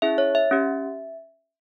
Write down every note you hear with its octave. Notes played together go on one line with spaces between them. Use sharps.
C#4 E4 G#4 E5
C#5
E5
C#4 G4